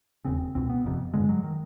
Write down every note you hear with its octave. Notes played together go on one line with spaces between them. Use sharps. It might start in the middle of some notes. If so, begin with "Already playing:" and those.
E1 D#2 C#3 C4
C#2 B2 C4
B3
G1 F2 C3
G#1 G2 D3 G#3
F#3
D#3